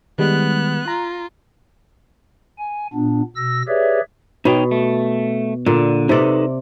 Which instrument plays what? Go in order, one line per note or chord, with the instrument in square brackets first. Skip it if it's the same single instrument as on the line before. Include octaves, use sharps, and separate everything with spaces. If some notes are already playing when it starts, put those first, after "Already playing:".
[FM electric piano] D#3 G3 G#3 [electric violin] B3 F#6
[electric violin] F4 [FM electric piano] A#5
[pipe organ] G#5
A#2 B3 D4
B2 E6 A#6
G4 G#4 B4 C#5 D5 E5
[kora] B2 [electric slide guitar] D#4 C#5 G5
[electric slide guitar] A3
[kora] A#2 [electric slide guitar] D3
[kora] C3 D5 [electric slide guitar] D#4 A4 B4